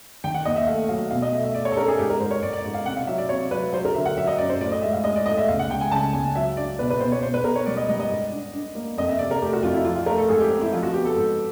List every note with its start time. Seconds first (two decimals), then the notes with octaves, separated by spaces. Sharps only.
0.24 D#3 G5
0.34 F#5
0.45 D#2 D#5
0.56 E5
0.67 A3 F5
0.89 F#3 F5
1.11 B2 F5
1.22 D#5
1.32 A3 E5
1.44 E5
1.54 A3 D5
1.65 C#5
1.72 A4
1.76 C#4 A#4
1.88 G#4
1.98 G#2 G4
2.10 A#4
2.20 G#2 C5
2.31 C#5
2.43 G#2 D5
2.53 D5
2.65 G#2
2.74 F5
2.85 C3 F#5
2.97 F5
3.07 F#3 E5
3.18 D5
3.29 C3 C#5
3.51 F#3 B4
3.73 F#3 C5
3.85 A#4
3.94 D3 E5
4.05 F#5
4.16 F#3 E5
4.27 D#5
4.38 F#2 D5
4.49 C5
4.60 A2 D5
4.72 D#5
4.82 G#3 E5
4.93 F5
5.04 G#3 D#5
5.16 D5
5.26 A2 D#5
5.38 E5
5.48 C#2 F5
5.59 F#5
5.69 C#2 G5
5.81 G#5
5.91 C#3 A5
6.13 C#2 G#5
6.35 F#3 E5
6.57 D4 D5
6.79 B2 B4
6.90 B4
7.00 B2 C5
7.12 C#5
7.23 B2 C5
7.34 B4
7.44 B2 A#4
7.55 C#5
7.66 G3 D5
7.77 D#5
7.89 G3 D#5
7.99 D#5
8.11 G#2
8.32 D4
8.53 D4
8.75 A#3
8.97 F2 D#5
9.08 E5
9.19 C3 D5
9.31 A#4
9.41 A3 G4
9.53 F#4
9.63 F2 F4
9.74 E4
9.85 F3 F4
9.96 F4
10.06 A3 A#4
10.18 A4
10.29 G#2 G#4
10.40 G4
10.50 C4
10.61 E4
10.73 F3 F4
10.83 F#4
10.94 B3 G4
11.05 A4
11.16 G#2